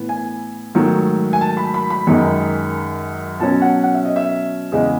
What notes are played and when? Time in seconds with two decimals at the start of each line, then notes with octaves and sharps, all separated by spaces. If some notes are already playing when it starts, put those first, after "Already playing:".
Already playing: A2 E3 B3
0.09 G#5
0.75 G#2 D#3 F#3 A3
1.33 G#5
1.41 A5
1.57 B5
1.74 B5
1.90 B5
2.07 F#2 D#3 G#3
3.39 B2 F#3 C#4 A5
3.62 F#5
3.84 F#5
3.94 E5
4.05 D#5
4.16 E5
4.72 E2 C#3 G#3 D#5